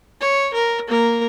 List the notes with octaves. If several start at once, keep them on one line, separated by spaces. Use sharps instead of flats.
C#5
A#4
A#3 A#4